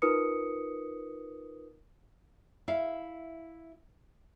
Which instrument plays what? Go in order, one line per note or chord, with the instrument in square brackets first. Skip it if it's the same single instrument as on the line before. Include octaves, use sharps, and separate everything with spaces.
[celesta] D#4 F4 A#4 B4 D#6 C#7
[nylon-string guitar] E4 E5 F5